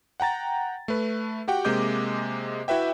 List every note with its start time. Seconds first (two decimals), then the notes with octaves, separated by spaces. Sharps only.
0.20 F#5 G5 A#5 A6
0.88 A3 B4
1.48 F#4 G4 F#5 G5
1.65 C3 G#3 A#3 D#5 D6 G6
2.68 E4 F#4 B4 E5 G5